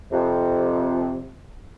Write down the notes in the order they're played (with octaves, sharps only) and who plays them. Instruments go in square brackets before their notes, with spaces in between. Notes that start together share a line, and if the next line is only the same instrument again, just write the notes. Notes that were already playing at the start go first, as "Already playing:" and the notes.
[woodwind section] F2 C3